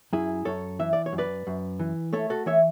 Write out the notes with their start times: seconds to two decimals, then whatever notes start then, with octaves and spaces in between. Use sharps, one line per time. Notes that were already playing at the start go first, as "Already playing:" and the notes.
0.13 F#2 E4 G#4
0.45 F#2 A4 C#5
0.79 E3 E5
0.93 D5
1.06 C#5
1.13 F#2
1.18 B4 D5
1.47 F#2
1.79 E3
2.13 A3 A4 C#5
2.30 F#4 A4
2.46 E3 C#5 E5